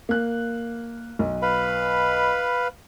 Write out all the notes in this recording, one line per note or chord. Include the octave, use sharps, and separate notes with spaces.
A#3 F#6
B1
B4 F5 B5